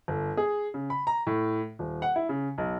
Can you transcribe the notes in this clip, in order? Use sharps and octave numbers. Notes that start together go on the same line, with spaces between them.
G1
G#4
C#3
B5
A#5
A2
D#1
F#5
E4
C#3
B1